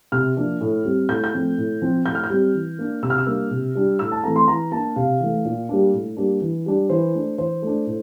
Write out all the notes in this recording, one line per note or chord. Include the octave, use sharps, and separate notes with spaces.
C3 F6
F3 A#3 D4
A2
G3 C4
A2 G6
G6
F3 A3 C4
A2
F3 C4
A2 G6
F6
G6
G3 C4
E3
A#3 D4
C3 E6
F6
E6
G3 A#3 D4
C3
G3 D4
A2 E6
A5
E3 A3 C4 A#5
C6
E3 A#5
A#3 D4 A5
C3 F5
E3 A3
A#2
G3 A#3 D4
A2
G3 A#3 D4
E3
G3 D4
E3 C5
A3 D4
E3 C5
A3 D4
A2